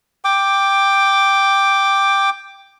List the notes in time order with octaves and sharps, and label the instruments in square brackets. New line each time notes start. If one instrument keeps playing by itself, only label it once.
[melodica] G5 D6